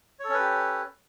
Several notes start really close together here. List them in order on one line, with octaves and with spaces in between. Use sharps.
C#5 A4 C#4 B4 G4